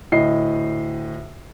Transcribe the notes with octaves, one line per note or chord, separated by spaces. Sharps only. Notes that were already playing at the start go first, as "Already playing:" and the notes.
D2 A2 D#5 C7